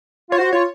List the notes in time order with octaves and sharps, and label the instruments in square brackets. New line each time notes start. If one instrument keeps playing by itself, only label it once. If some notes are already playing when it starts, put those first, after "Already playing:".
[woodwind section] F4 [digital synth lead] C#5
[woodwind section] F#4 [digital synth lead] C5
[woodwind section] F4 [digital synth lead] C#5